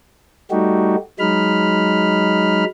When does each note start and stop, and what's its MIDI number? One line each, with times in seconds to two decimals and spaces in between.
0.51 0.96 55
0.51 0.96 57
0.51 0.96 63
0.51 0.96 66
0.51 0.96 67
1.19 2.65 54
1.19 2.65 56
1.19 2.65 63
1.19 2.65 83
1.19 2.65 89